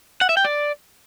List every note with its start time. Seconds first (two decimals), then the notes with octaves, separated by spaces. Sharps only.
0.21 F#5
0.29 E5
0.37 G5
0.45 D5